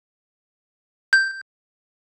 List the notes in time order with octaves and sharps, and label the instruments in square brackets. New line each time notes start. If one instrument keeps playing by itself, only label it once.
[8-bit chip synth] G6